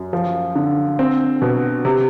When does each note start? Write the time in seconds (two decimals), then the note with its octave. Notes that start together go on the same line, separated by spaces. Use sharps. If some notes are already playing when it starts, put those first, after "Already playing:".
Already playing: F#2
0.13 F3
0.56 D3
0.99 C4
1.42 B2
1.85 C3